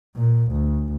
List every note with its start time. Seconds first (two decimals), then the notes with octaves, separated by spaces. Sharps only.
0.17 A#2
0.51 D2